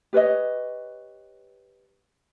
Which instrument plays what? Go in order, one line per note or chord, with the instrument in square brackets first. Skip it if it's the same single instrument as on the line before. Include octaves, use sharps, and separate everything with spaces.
[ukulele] G4 B4 C#5 D#5